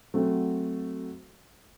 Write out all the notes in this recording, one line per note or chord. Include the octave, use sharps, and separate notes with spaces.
F#3 A3 C4 F#4